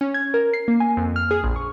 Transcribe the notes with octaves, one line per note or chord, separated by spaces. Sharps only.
C#4
G#6
A#4
C7
A#3
G#5
F2
F6
G#4
A#1
C#6